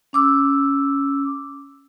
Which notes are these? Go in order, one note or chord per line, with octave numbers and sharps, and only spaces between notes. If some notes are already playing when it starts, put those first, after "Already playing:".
C#4 D6 E6